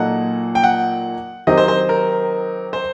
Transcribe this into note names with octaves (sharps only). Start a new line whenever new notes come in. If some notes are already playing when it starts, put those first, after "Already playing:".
Already playing: A#2 F#3 A#3 D#4 A4 F#5
G5
F#5
D#3 F#3 C4 D#4 G4 D#5
C5
C5
A#4
C5